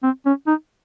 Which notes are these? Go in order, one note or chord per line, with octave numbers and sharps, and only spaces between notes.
C4
C#4
D#4